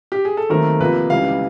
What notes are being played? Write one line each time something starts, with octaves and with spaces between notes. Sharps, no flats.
G4
G#4
A4
D#2 D#3 F#3 A3 C4 A#4
F2 C3 F3 A#3 B4
C#2 C#3 E3 G3 F5